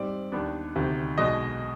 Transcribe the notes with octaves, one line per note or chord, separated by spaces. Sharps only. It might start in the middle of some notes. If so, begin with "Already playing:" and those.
Already playing: G#2 G3 C4 D5
D#2 D#3 B3 D4
D2 C3 D#3
B1 B2 G#3 D#5